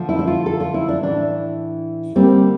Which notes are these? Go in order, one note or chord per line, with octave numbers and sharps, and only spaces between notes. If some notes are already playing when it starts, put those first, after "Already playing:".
Already playing: D3 F3 A3
E4
E4
F4
A4
F4
E4
D4
A2 E3 A3 D4
D3 G3 A#3 C4